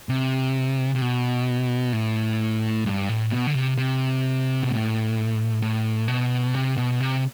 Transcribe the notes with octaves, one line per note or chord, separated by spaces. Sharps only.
C3
C3
B2
A2
G2
A2
B2
D3
C3
C3
B2
A2
A2
B2
C3
B2
C3